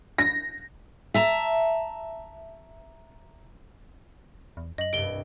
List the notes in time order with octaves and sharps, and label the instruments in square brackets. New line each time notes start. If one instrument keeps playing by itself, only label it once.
[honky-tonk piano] A#6
[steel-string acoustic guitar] E5 A5 A#5
[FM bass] E2
[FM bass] F#2 [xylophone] D#5 F#7
[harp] C2 G2 [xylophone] D7 G7